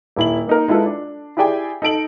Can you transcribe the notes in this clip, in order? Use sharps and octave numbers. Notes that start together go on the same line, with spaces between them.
D#1 E4 F#7
A#3 D#4 A#4
G#3 E4 F4 A4 B4
D4
E4 G4 G#4 D5 G5 G#5
D#4 A4 D7 F#7